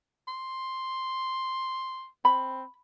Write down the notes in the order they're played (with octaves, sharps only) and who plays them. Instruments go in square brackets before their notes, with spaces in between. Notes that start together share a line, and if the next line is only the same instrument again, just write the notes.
[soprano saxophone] C6
[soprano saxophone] C4 [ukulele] B5